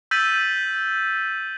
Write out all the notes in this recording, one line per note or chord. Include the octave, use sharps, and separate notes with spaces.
E6 G6 A6 B6 D#7 F#7